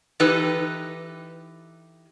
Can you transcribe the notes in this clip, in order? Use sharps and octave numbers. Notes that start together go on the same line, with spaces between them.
E3 D#4 G4 A4 B4